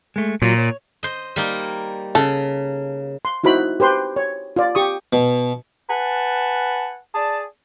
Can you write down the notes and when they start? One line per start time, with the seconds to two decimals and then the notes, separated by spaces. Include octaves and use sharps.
0.16 G#3 A3
0.42 A#2 F#3 F4
0.58 C#5
1.03 C5 D#5
1.36 G3 A#3 D#4
2.15 C#3 A4
3.25 C6
3.44 D#4 E4 F#4 C5 B5
3.80 G4 B4 C5 C6
4.16 C#5
4.56 F4 D5
4.75 G4 C#6 D#6
5.13 B2
5.90 B4 F#5 G#5 A5
7.14 G#4 D5 A5